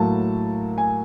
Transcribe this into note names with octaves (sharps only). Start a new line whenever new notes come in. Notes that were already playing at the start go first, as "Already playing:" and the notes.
Already playing: A2 F#3 A#3 A5
G#5